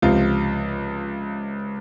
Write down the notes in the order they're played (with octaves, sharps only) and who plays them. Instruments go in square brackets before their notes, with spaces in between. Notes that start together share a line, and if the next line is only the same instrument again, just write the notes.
[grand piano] C#2 C3 F3 F4